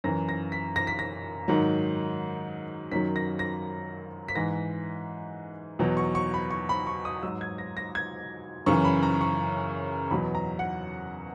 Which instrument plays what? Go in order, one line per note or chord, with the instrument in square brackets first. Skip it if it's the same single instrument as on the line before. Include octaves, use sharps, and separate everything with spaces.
[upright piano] F#2 E3 A#6
A#6
B6
A#6
B6
A#6
G#2 D#3 F#3
F#2 D#3 F#3 B6
A#6
A#6
B6
G#2 E3 A#6
E2 B2 F#3
C#6
C#6
B5
C#6
B5
C#6
D#6
G#2 F#3 E6
G#6
A#6
A#6
G#6
F#2 C#3 E3 C#6
B5
A#5
C#6
E2 B2 F#3 B5
A#5
F#5